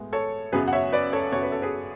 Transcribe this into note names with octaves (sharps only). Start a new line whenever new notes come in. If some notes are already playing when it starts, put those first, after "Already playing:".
Already playing: A2 G#3 B3
A4 C#5
F#2 C#3 F#3 B3 G#4 B4
F#5
C#5 E5
B4 D5
A4 C#5
F#2 C#3 F#3 B3 C#5
B4
A4
G#4 B4